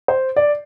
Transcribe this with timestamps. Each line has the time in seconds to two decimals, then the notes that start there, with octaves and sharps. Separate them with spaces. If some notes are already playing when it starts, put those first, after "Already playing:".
0.08 C5
0.36 D5